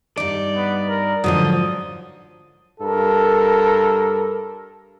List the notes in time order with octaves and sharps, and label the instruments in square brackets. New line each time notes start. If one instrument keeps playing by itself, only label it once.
[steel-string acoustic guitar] G2 D#4 [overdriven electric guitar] D5
[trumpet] B3
A#4
[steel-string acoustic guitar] G#2 D3 D#5 [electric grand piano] F3 F#3 [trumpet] D#6
[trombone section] G2 A4 A#4